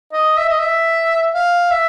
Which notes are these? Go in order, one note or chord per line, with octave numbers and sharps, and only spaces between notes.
D#5
E5
D#5
E5
F5
E5